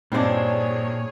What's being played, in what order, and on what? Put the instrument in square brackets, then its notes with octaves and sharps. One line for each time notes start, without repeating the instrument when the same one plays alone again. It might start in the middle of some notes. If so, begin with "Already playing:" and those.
[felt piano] G2 D#4 C5 [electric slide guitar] A#2 [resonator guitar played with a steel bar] C4 D4 [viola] G#4 C#5